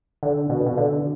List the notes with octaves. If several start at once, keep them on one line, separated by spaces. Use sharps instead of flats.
D3
B2
B2
D3